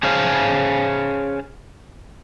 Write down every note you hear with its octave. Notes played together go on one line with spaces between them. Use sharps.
C#4 G#4 C5 C#5 F5 A5